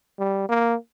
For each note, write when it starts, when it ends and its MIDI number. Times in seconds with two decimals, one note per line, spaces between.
0.19 0.44 55
0.49 0.75 58